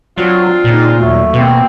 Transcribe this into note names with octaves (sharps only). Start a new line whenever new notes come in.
F#3 C4 D4 F4
A#2 C#3 D#4
D#2 F#3 A3
B2 A#3 C4